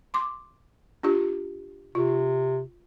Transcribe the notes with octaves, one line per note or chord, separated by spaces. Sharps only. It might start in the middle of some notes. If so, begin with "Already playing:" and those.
C6 D6
D4 F4 G4
C3 F4